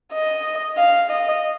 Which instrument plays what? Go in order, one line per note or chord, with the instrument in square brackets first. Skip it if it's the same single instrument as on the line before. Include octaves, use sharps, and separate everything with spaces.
[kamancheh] D#5
F5
D#5